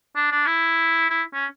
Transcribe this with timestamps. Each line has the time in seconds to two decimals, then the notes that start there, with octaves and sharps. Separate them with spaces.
0.16 D4
0.32 D4
0.47 E4
1.10 E4
1.33 C#4